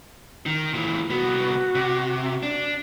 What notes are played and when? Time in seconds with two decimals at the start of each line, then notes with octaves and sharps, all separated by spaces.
0.46 D#3
0.74 A#2 E3
1.10 C2 B3 F#4
1.75 C3
2.43 D4